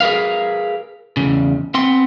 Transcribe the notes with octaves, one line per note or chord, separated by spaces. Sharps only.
G#4 A#4 B4 F5
E2 C#3
B3 C4 C6